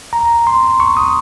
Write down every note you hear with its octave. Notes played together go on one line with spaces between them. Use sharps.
A#5
C6
C#6
D#6